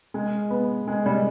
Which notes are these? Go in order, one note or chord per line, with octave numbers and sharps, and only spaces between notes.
G#3
B3
G#3
G3